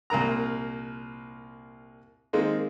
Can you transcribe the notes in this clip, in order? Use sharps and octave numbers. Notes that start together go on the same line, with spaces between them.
C2 A#2 A#4 A#5
D#3 G#3 A#3 C4